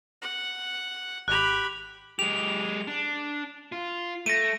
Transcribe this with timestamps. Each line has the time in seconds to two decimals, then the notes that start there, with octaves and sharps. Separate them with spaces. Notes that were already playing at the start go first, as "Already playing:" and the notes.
0.22 F#5
1.28 G#1 G4 B5 F#6 F7
2.19 G#3 G4 F7
2.87 D4
3.72 F4
4.26 A3 A#6 D7 D#7